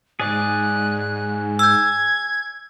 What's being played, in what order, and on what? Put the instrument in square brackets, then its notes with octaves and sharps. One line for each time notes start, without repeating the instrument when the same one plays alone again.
[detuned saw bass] G#2 [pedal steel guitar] G#4 D5 D6 [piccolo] F#6
[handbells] E6 G6 [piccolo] G#6